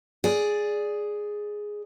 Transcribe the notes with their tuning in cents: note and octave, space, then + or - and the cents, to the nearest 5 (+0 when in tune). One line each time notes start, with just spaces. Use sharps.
G#4 +0 D5 +0